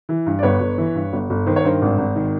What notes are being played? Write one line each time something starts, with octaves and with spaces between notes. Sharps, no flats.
E3
G2
D5
G1 B4 C#5
G1
E3
G2
G1
G1
D#3 C5
C#5
G2 A#4 C5
G#1
G#1
D#3